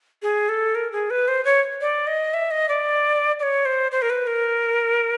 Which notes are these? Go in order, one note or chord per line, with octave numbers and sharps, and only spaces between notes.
G#4
A4
A#4
G#4
B4
C5
C#5
D5
D#5
E5
D#5
D5
D5
C#5
C5
C5
A#4
B4
A#4